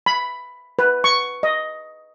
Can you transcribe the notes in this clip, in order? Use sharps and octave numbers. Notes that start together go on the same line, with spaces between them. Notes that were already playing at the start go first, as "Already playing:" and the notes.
B5
B4
C#6
D#5